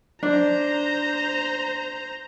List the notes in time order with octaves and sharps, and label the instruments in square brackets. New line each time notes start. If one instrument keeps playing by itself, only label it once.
[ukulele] D4 [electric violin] C5 A#5